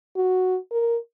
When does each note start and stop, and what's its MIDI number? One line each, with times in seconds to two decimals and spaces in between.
0.16 0.57 66
0.71 0.97 70